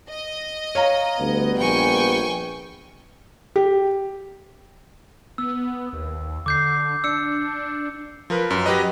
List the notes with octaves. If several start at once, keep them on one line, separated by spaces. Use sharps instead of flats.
D#5
C#5 F5 A#5
D2 G3 B3
A#1 G5 G#5 C#6
G4
B3 E6
D#2
D3 D6 G6 C7
D4 E6 C#7
F3 A#4 B4
F#2
F#3 G4 B4 D#5